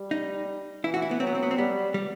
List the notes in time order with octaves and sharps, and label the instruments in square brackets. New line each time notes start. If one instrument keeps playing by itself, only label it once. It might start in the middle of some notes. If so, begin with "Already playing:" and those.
Already playing: [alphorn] G3
[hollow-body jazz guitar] D#4
[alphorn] E3 [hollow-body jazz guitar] E4
[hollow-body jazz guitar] F#4
E4
B3
[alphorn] F#3 [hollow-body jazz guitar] C4
[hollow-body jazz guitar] B3
C4
B3
C4
[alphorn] G3 [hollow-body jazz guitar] B3
[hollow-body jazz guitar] G3